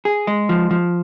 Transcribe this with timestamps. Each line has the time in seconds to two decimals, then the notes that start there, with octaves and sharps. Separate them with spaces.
0.05 G#4
0.27 G#3
0.49 F3
0.71 F3